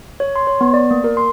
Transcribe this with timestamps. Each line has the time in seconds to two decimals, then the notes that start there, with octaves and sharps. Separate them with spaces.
0.20 C#5
0.36 C6
0.47 C#5
0.61 B3
0.74 D5
0.91 A#3
1.04 A#4
1.17 C6